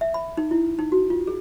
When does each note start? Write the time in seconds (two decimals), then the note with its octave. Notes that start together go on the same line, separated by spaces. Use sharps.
0.01 E5
0.14 B5
0.37 D#4
0.51 E4
0.79 D#4
0.92 F#4
1.10 F4
1.27 G#4